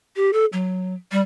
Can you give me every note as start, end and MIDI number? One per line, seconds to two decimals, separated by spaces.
0.16 0.31 67
0.33 0.45 69
0.53 0.94 54
1.11 1.21 55